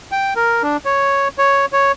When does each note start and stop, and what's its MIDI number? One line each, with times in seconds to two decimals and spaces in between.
0.12 0.34 79
0.36 0.63 70
0.63 0.77 62
0.85 1.28 73
1.38 1.66 73
1.73 1.92 73